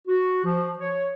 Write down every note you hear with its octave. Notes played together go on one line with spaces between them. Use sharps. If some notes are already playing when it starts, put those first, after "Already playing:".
F#4
F3
C#5